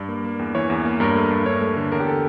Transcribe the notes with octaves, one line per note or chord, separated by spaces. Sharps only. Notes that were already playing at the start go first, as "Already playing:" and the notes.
Already playing: G2 D5
A#3
A#3
E2
E3 C#5
E2
A#3
G2 A#4
A3
G2
G2 C#5
A3
D3
E2 A#4
G4
A4